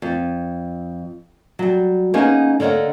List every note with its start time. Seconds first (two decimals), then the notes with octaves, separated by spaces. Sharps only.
0.02 F2
1.59 F#3 G3
2.14 A#3 B3 C#4 D#4 G#4
2.60 D3 A#3 C#5 D#5 F#5